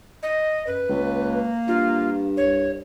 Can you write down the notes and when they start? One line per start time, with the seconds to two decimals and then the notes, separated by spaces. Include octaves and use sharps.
0.23 D#5
0.67 F#2 B4
0.89 C#2 A#3
1.68 G2 F4
2.37 C2 C#5